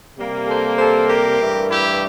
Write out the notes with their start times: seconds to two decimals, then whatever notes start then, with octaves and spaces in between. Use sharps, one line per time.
0.17 C3 G3 A#3
0.47 A4 C5
0.78 A4 C5
1.09 G4 A#4
1.40 G2 E3 A3
1.70 E4 G4